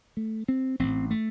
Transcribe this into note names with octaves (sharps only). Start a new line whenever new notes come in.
A3
C4
A1 A2 C4
A3